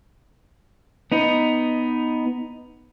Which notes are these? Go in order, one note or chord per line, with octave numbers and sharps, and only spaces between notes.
B3 D#4